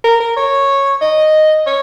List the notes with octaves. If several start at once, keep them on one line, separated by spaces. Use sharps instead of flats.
A#4
A#4
C#5
D#5
C#5